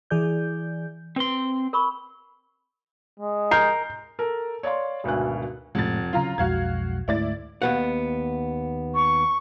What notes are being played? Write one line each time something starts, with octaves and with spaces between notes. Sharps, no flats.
E3 G#4 D5 G6
C4 B4 C6
A#4 B5 C#6
G#3
A#4 G6 C7
A4 A#4
C#5 D5 F5 C6
G#1 D2 B2 G#5 F#6
F1 A2 G#3 A6
C#3 F#3 F4 F5 A#5
B1 F2 G#3 F#4 F5 G#6
D2 G#2 A3 E4 D5 A6
D#2 B3 F#5
C#6